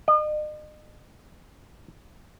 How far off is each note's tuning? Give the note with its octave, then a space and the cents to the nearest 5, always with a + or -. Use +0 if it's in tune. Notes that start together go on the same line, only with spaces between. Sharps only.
D#5 -40